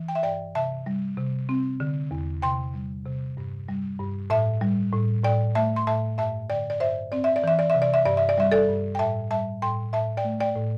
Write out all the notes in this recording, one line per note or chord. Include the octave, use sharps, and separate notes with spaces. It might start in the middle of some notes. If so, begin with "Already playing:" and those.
Already playing: E3
G5
E5
G2 D5 G5
C3 E5 A5
G3
C3
C4
D3
E2
C3 G5 C6
G3
C3
G2
G3
G2
A2 E5 A5
G3
A2
A2 D5 G5
A3 E5 A5
C6
A2 E5 A5
G2 E5 A5
D3 D5 G5
D5
G2 C5 E5
C4 D5
E5
D5
E3 E5
D5
C3 E5
D5
E5
G2 D5
E5
D5
G3 E5
A4 D5
G2
G5
A2 E5 A5
G3 E5 A5
A2 G5 C6
A2 E5 A5
D5 G5
A3
D5 G5
A2